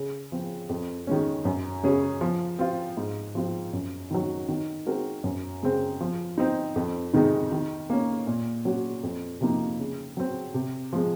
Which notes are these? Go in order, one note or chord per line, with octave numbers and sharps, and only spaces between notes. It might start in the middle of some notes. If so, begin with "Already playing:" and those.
Already playing: C#3
F3 C4
F2
D#3 G#3 C#4
F#2
C#3 G#3 C#4 G#4
F3
C4 F4
G#2
F3 C4 F4
F#2
D#3 F#3
D#3
G#3 C4 F#4 A#4
F#2
C#3 G#3 C4
F3
C4 D#4
F2
C3 D#3 G#3 D#4
D#3
A#3 C#4
A#2
F#3 C#4 F#4
F2
C3 F3 A#3 D#4
C#3
F#3 C4
C3
F3 G#3